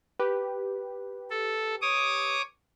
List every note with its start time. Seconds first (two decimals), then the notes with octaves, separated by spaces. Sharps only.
0.19 G4 B4
1.30 A4
1.82 C#5 D6 D#6